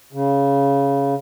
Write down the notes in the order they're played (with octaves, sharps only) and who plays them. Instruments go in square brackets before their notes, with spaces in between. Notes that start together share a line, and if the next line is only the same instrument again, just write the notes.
[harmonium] C#3